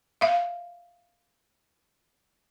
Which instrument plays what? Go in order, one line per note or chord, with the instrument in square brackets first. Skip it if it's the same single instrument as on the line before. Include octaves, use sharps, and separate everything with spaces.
[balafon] E5 F5